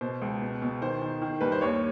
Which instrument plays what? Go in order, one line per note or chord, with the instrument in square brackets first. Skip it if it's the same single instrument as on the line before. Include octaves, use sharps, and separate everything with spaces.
[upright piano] B2 C5
C#2
B2
B2
D#3 C5
D#3
D#3
G2 B4
C5
D#2 C#5